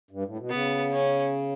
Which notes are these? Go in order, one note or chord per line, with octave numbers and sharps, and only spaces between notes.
G2
A2
B2
C#3 B3
C#4